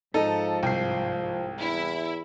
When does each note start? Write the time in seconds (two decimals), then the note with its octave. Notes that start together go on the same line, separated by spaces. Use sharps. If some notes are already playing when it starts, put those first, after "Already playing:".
0.14 G#2 F3 D#4 A4
0.63 C2 G5 C7
1.59 E2 E4